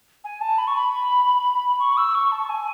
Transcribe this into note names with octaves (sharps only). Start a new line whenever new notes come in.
G#5
A5
B5
C#6
B5
C#6
E6
C#6
A5
A5
G#5